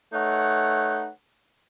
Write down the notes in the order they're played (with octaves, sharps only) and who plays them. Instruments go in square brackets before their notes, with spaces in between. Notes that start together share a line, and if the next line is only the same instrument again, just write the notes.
[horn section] A3 D#4 B4 C#5 F#5